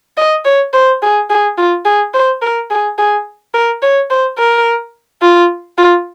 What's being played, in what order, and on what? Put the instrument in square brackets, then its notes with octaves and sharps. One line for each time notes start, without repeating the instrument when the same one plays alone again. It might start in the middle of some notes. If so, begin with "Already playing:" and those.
[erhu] D#5
C#5
C5
G#4
G#4
F4
G#4
C5
A#4
G#4
G#4
A#4
C#5
C5
A#4
F4
F4